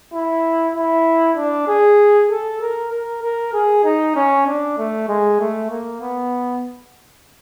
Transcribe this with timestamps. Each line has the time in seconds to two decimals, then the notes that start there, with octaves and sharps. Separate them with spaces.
0.13 E4
0.75 E4
1.37 D4
1.68 G#4
2.30 A4
2.61 A#4
2.92 A#4
3.23 A#4
3.53 G#4
3.84 D#4
4.16 C#4
4.46 D4
4.78 A3
5.08 G#3
5.40 A3
5.70 A#3
6.01 B3